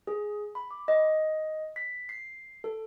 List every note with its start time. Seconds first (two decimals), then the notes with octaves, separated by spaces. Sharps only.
0.07 G#4
0.55 B5
0.71 D6
0.88 D#5
1.76 B6
2.09 C7
2.64 A4